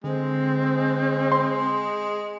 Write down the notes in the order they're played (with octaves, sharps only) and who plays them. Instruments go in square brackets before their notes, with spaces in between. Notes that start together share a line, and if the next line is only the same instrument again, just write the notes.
[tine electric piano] D3 [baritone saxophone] G#3 [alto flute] C4
[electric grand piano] C6